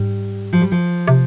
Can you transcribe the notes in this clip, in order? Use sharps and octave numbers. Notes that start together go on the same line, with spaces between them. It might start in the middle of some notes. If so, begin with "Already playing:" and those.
Already playing: G#2 G3
F3
G3
F3
C3